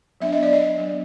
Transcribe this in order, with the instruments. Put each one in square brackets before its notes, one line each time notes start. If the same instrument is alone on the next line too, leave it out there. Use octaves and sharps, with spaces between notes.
[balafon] F#3 B3 D4 E5
D#5
D5
D#5
F#3 B3 D4